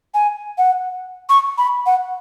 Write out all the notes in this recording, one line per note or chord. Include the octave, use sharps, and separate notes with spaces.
G#5
F#5
C#6
B5
F#5